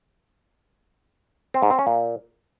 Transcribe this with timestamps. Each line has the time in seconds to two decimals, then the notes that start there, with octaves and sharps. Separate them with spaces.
1.54 C4
1.62 G#2
1.71 C4
1.79 C#4
1.87 A#2